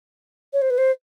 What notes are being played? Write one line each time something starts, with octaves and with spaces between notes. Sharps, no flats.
C#5
C5
B4
C5